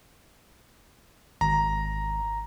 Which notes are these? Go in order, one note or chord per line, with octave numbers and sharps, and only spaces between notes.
G#1 A#5